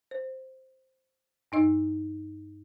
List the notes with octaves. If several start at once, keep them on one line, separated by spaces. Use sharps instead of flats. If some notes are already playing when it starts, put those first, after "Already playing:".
C5
G2 D#4 D#5 E6